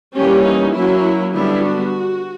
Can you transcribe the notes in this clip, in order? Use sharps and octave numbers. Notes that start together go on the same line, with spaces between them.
E3 G3 A#3 C#4 G4
D#4
F#3 A#3 C#4 E4
D3 G3 B3 D4 E4
F#4